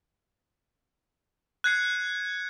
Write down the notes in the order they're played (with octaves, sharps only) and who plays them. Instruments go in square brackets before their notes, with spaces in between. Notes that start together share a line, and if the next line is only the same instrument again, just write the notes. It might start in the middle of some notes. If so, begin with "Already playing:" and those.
[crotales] F#6 G#6 C7 C#7